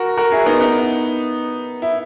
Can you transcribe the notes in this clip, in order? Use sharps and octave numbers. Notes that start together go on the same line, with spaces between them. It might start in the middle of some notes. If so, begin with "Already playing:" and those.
Already playing: F#4 A#4
F#4 A#4
E4 G#4
B3 D#4
B3 D#4
E4